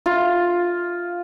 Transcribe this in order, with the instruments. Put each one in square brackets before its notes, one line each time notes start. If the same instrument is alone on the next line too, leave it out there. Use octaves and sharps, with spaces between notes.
[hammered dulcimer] F4